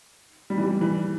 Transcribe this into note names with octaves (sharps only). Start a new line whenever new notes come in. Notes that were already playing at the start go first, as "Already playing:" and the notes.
G3
E3
G3
E3